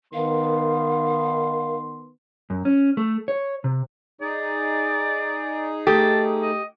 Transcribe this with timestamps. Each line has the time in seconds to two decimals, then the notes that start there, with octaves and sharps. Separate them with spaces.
0.14 D#3 B3 A#4 F5 C6
2.50 F#2
2.65 C#4
2.97 A3
3.28 C#5
3.64 C3
4.21 D#4 G#4 D5
5.87 A3 G4 A5 D#6
6.42 D#5